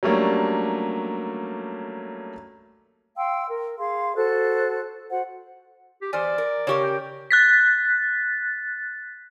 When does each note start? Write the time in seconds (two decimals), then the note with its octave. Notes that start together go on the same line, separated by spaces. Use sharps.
0.03 F#3 G3 A3 A#3 C#4 D4
3.17 F5 G5 C6 E6
3.49 A#4
3.79 G#4 F5 C6
4.17 F#4 A4 C5 F#6
5.10 F#4 C5 F#5
6.02 G4
6.13 E2 C5 D5 G#5 F6
6.38 A#4
6.67 C#3 G4 A#4 C#5 C#6
6.83 G5
7.31 F#6 A6 B6